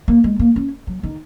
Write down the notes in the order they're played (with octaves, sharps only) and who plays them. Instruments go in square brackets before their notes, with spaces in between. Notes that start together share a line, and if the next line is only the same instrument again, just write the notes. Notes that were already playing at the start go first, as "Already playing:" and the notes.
[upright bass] A#3
G#3
A#3
C#4
F#3
D#3